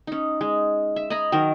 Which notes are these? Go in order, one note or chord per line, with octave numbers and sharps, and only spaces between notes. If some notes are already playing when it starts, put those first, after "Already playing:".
C#4 D#4
G#3
E5
D#5 G#5 A#5 B5
D#3 F#3 A#4 C5